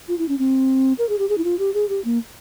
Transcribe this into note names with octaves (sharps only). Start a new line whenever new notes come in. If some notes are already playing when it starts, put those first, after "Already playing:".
F4
E4
C#4
C4
A#4
G#4
G4
G#4
E4
F4
G4
G#4
G4
A#3